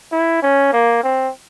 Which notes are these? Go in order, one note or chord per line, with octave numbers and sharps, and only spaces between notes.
E4
C#4
A#3
C4